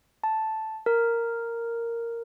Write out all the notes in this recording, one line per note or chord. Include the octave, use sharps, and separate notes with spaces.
A5
A#4